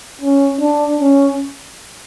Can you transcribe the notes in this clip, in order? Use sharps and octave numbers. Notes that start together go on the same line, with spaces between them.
C#4
D4
C#4